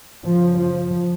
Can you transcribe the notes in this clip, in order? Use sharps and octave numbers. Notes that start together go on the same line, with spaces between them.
F#2 C#3 F3
F3